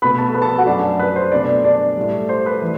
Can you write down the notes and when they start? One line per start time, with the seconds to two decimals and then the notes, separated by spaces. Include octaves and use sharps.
0.02 B2 A3 B4 B5
0.18 A4 A5
0.34 B4 B5
0.42 A4 A5
0.58 F#4 F#5
0.66 F#2 F#3 A3 D4 D5
0.99 B4
1.16 C5
1.31 B2 A3 D4 D5
1.64 D4 D5
1.97 A2 G3
2.29 C5
2.46 B4
2.62 E3 A3